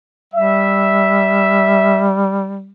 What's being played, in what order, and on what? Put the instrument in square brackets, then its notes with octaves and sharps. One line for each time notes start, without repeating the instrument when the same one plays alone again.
[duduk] G3 [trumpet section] E5